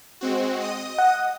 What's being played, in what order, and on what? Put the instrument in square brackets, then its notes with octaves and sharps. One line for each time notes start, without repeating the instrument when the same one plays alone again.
[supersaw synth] G#3 C4 F#4
D#5 D#6
[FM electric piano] F#5